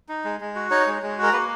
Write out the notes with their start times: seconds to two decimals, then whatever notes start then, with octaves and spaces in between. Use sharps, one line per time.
0.09 D#4
0.24 G#3
0.41 G#3
0.56 F#4
0.71 D#4 C#5
0.87 G#3
1.02 G#3
1.18 F#4 A#4
1.33 A#3 B4